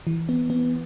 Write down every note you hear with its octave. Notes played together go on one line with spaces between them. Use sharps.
E3
B3
B3